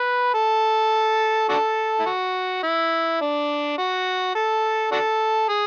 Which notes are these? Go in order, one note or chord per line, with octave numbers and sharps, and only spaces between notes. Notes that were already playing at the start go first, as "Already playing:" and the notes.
Already playing: B4
A4
D4 F#4 A4
E4
F#4
E4
D4
F#4
A4
D4 F#4 A4
G#4